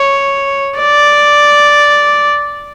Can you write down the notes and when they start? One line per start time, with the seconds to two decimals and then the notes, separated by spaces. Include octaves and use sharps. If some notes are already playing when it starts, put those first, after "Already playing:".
Already playing: C#5
0.79 D5